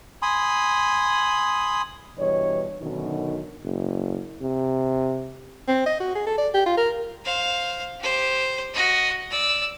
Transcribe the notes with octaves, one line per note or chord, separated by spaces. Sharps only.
G#5 B5 C6 D#6
G2 B2 E3 C#5 D#5
F#2 B2 D3 D#3 D#4
F#1
C3
C4
D#5
F#4
G#4
A4
D5
G4
F4
A#4
C5 F5
G4 C5
F#4 D#5
D5 E6